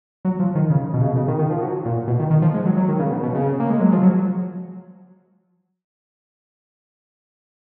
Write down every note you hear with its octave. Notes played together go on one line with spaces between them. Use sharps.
F#3
F3
D#3
C#3
B2
C#3
B2
C#3
D#3
D#3
F3
F#3
A#2
B2
D#3
D#3
F3
G#3
F#3
F#3
D#3
C#3
B2
B2
C#3
A#3
G#3
F#3
F3
F#3